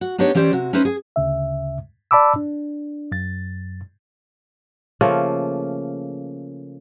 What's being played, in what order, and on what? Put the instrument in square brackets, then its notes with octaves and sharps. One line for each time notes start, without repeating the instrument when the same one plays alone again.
[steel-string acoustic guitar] F#4
B3 D4 D#4 G4 C#5
E3 C#4 G4 C5 D5
C3 F#4
C#4 D#4 B4 C5 E5
G#4 G#5
[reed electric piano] D2 C#3 E5
D5 A5 B5 D6 E6
D4
F#2 A6
[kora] C#3 F3 A3 A#3